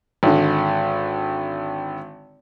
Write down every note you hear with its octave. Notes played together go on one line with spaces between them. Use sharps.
G#1 D3